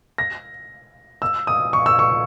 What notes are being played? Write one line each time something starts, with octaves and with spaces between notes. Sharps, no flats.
A#6
E6
D#6
C#6
E6
C#6